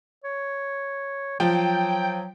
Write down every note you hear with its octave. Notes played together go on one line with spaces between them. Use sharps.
C#5
F3 F#3 G5